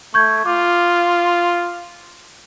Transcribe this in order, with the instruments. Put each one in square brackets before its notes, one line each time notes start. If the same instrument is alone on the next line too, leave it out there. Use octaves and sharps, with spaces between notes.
[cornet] A3 [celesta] C#6 G6 G#6
[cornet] F4 [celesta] D6